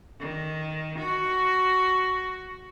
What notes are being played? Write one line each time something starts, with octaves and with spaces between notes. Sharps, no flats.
D#3
F#4